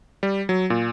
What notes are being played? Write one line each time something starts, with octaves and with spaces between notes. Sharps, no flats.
G3
F#3
A#2